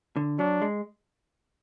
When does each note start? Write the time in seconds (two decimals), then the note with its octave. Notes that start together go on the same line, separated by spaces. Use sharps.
0.16 D3
0.39 F#3 D4
0.62 G#3